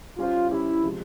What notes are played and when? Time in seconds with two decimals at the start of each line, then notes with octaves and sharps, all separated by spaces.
0.19 G3 C#4 F4 G4 C5
0.51 G3 C#4 E4 G4 C5
0.83 C3 F3 G#3